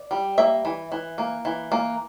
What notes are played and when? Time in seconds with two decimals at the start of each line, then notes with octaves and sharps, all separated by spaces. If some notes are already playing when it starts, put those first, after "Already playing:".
Already playing: D5
0.11 G3
0.38 A#3 E5
0.65 E3
0.92 E3
1.18 A#3
1.45 E3
1.72 A#3